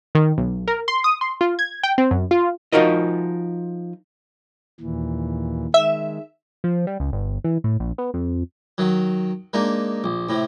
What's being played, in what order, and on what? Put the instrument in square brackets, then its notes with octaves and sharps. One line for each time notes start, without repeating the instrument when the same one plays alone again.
[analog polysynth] D#3
B1
A#4
C6
D#6
C6
F4
G#6
G5
C4
F#2
F4
[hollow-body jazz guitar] F3 D#4 F4 F#4 A#4 D#5
[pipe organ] D#2 A#2 E3
[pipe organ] D#3 G#3 [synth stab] E5
[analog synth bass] F3
G3
C#2
G1
E3
A2
A#1
B3
F2
[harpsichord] D#3 F#3
G#3 A#3 D4 D#4
A#1
A2 C3